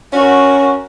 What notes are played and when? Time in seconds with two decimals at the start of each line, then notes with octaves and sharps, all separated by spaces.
0.13 C#4 F#4 A#4